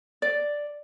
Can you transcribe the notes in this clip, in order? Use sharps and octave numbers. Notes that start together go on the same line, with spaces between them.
D5